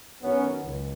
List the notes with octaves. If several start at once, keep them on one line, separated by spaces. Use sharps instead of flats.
F#2 D#3 F#3 B3 C#4
C#2